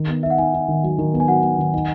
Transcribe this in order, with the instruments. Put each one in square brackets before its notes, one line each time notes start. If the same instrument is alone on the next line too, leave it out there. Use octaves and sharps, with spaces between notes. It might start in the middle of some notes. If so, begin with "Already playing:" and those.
Already playing: [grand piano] D#3
B3
[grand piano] D#4 [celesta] E5
[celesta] F#5
[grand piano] D#4 [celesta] G#5
[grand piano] D#4
D#3
F#3
D#3
B3
[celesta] G#5
[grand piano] F#3 [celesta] F#5
[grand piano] B3
D#3
D#4